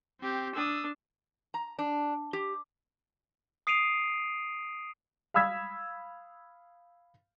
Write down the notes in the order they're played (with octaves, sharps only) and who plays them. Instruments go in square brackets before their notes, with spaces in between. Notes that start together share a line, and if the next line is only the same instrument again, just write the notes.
[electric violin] C4 G4
[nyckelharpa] D4 [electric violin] D#6 E6
[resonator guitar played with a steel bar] A#5
D4
G4
[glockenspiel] D#6 C7 D7 D#7 F7
[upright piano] F5 B5 D#6 E6 G#6 B6